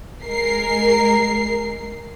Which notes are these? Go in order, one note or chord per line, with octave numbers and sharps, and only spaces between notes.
G#3 A#4 C7